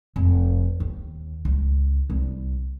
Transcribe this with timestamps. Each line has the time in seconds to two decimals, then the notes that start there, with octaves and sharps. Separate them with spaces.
0.16 F1
0.80 D#2
1.45 C#2
2.10 C2